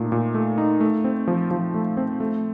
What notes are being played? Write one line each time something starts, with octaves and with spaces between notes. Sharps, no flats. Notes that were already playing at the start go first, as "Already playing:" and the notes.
Already playing: A#2 A3 D#4
A#2
A3
D#4
A3
C4
F3
F3
A3
C4
A3